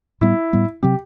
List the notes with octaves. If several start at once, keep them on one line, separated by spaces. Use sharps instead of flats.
A2 G3 B3 E4
A2 G3 B3
C3 F#3 C4 G4